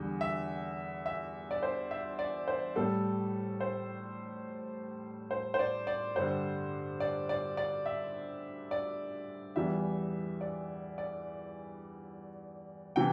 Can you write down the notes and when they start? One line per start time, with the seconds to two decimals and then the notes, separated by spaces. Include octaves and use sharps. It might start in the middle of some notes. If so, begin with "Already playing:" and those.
Already playing: E2 D3 G3
0.21 E5
1.06 E5
1.51 D5
1.63 C5
1.91 E5
2.19 D5
2.48 C5
2.76 A2 G3 A4
3.61 C5
5.31 C5
5.54 C5
5.59 D5
5.87 D5
6.16 G2 D3 G3 C5
7.00 D5
7.29 D5
7.57 D5
7.86 E5
8.71 D5
9.56 E2 E3 G3 E5
10.41 D5
10.98 D5
12.96 C3 E3 G5